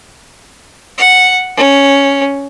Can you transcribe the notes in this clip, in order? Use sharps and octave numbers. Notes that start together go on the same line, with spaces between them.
F#5
C#4